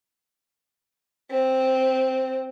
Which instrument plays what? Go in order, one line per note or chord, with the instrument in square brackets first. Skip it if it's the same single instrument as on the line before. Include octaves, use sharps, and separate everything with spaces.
[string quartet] C4